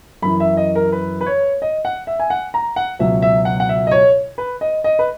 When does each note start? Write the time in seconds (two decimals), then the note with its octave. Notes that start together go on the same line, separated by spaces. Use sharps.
0.22 F#2 E3 B5
0.40 E5
0.57 D#5
0.75 A#4
0.92 B4
1.21 B4
1.26 C#5
1.62 D#5
1.85 F#5
2.07 E5
2.20 G#5
2.30 F#5
2.54 A#5
2.76 F#5
2.99 C#2 B2 F#3 E5
3.22 E5
3.45 F#5
3.60 F#5
3.69 E5
3.87 D#5
3.91 C#5
4.38 B4
4.61 D#5
4.84 D#5
4.99 B4